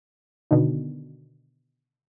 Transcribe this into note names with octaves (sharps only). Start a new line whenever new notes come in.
B2 D3 D#3